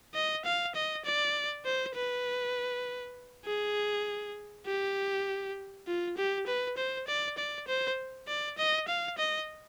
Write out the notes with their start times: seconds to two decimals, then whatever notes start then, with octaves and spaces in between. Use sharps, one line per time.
0.14 D#5
0.45 F5
0.75 D#5
1.05 D5
1.65 C5
1.95 B4
3.46 G#4
4.66 G4
5.87 F4
6.17 G4
6.47 B4
6.77 C5
7.07 D5
7.37 D5
7.68 C5
8.28 D5
8.58 D#5
8.88 F5
9.18 D#5